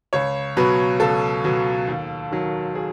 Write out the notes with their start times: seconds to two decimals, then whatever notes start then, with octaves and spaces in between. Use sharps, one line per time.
0.13 C#2 C#5
0.57 B2 F#3 B4
1.00 C#2 A4
1.44 B2 F#3
1.88 D#2
2.32 D#3 F#3
2.75 G#4